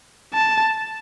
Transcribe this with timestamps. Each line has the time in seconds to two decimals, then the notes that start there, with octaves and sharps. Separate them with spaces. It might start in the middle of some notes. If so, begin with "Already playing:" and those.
0.34 A5